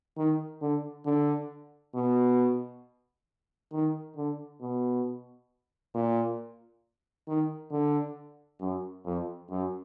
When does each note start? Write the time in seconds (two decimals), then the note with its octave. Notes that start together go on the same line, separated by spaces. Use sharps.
0.18 D#3
0.61 D3
1.06 D3
1.95 B2
3.73 D#3
4.17 D3
4.61 B2
5.95 A#2
7.28 D#3
7.71 D3
8.60 F#2
9.05 F2
9.50 F#2